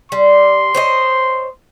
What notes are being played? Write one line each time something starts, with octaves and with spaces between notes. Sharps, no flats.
G3 C6
C5 C#5 D#5